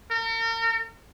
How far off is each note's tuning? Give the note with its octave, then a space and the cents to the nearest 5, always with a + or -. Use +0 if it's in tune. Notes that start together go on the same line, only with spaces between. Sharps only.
A#4 -40